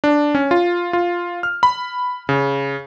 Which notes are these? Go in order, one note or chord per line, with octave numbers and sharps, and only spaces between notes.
D4
C#4
F4
F4
F6
B5
C#3